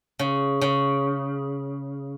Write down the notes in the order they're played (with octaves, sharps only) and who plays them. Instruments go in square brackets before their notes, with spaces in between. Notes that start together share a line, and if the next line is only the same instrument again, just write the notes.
[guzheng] C#3
C#3